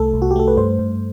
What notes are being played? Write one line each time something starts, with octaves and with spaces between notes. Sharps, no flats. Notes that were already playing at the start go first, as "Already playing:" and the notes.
Already playing: C2 A3 A4
C2
F#4
G4
A3 A4
B4
G2 C5
G2